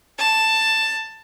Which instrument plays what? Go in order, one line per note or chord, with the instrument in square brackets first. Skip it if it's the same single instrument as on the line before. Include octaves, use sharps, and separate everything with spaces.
[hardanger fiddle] A5